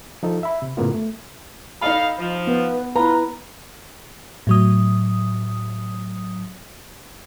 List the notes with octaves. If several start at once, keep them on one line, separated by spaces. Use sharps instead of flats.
F3 D#4 A4
E5 B5
C3
F#2 A2 C#3 A#3 B3 F4
A3
D#4 A4 D#5 F5 B5
F3 F4
B3 B4
E4 F4 B4 A#5
A2 F#3 D#6